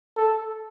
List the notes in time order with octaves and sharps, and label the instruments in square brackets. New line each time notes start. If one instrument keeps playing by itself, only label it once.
[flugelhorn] A4